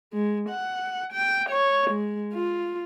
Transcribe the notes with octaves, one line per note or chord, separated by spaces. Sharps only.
G#3
F#5
G5
C#5
G#3
F4